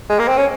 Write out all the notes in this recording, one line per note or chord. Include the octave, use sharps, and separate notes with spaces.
G#3
A#3
C4
C#4